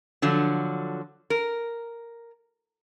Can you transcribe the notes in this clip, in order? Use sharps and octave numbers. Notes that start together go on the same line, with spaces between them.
D3 F3 F#3
A#4